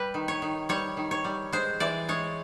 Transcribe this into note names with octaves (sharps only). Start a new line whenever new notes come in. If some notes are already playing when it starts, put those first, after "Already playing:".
Already playing: G3 B4
D#3
C#5
D#3
G3 C#5
D#3
C#5
G3
G#3 C5
E3 D5
G#3 C#5